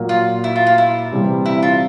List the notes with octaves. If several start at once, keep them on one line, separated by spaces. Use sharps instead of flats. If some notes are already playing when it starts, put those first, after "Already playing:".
Already playing: A#2 F#3 A#3
F4
E4
F4
F4
E4
C3 E3 G3 C4
E4
F4